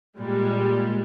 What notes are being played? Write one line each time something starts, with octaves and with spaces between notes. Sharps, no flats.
A#2 G3 G#3